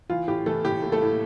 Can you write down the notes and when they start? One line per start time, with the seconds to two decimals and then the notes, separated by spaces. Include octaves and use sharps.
0.10 E3 F4
0.28 A2 G4
0.46 E3 A3 A4
0.65 A2 G4
0.83 A2
0.92 A3 A4
1.02 A2